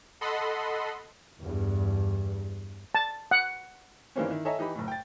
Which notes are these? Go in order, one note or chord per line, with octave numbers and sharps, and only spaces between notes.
A4 D#5 F#5 B5 C6
E2 G2
A5
F#5
G2 D#3 E3 A#3 C4 C#4
D#3 E4
A4 C#5 D#5 E5 G#5 A#5
E3 D#4 G4 B5
F#1 A2
G5 A6